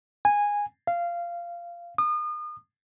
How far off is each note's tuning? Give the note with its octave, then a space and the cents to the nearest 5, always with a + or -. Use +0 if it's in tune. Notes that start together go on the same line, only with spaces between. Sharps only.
G#5 -15
F5 -15
D#6 -35